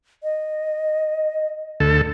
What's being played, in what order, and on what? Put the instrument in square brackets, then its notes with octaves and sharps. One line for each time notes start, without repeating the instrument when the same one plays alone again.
[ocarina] D#5
[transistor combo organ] D2 A4